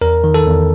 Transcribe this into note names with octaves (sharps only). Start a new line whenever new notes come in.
E2 A#4
D#3
A4
E2